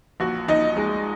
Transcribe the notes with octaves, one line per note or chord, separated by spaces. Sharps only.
A#1 F#4
A#1 D#4 D#5
G#3